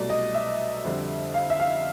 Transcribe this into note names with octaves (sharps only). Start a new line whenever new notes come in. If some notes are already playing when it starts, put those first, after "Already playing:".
Already playing: C2 B2 F#3 A3 D5
D#5
E5
F2 D3 G3
F5
E5
F5